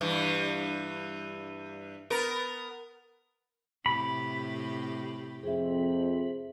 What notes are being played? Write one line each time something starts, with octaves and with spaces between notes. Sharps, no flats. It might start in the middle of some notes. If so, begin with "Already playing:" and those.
G2 E3
B3 A#4
A2 C3 G4 B5
F2 C4 G#4 E5